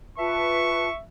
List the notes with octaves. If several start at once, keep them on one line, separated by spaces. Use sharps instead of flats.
F4 B4 E5 A5 C#6